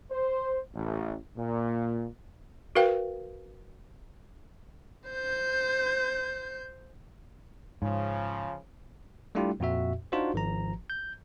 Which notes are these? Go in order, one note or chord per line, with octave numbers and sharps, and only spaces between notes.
C5
A1
A#2
F#4 A#4 B4 F5 G5
C5 G6
G#2 C#3 F3
G3 A3 D4 E4 F4 G4
F2 A#2 F#4 E5
D4 D#4 F4 F#4 C5
G#1 F3 A#5
G6